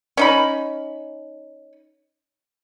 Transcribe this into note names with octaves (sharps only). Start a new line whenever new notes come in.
C#4 D#4 B5